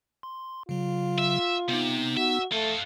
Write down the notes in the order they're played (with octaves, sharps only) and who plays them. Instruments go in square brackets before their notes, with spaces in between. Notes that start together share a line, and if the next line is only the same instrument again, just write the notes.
[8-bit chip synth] C6
[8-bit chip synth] C#3 F#3 [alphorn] F4
[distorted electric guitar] E5
[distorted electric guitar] C3 [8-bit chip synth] B3 D#4
[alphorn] F#4 [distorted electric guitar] E5
[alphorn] A3 [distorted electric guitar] F4 A4